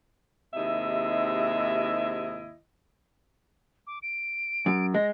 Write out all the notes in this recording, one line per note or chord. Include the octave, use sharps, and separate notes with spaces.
D#2 G#2 C3 E4 D#5 E5
D6
D7
F#2
G#3 A#6